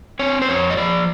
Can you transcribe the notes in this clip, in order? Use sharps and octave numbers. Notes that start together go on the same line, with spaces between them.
C4 C#5
C5
F2 C#5
D#5
F3 D5